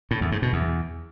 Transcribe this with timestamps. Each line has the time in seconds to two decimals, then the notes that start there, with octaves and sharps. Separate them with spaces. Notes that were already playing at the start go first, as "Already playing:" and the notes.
0.11 A2
0.21 E2
0.32 G#2
0.42 B2
0.53 E2